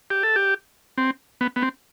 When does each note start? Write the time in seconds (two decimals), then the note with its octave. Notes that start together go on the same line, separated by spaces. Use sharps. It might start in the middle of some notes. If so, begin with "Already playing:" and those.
0.10 G4
0.23 A4
0.36 G4
0.98 C4
1.41 B3
1.56 B3
1.62 C4